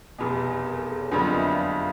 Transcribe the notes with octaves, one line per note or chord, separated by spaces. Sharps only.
F1 E2 B2
A#4
A4
G#4
C#5
F#1 F2 D3 G3 B3 D5
D#5
E5
F5
F5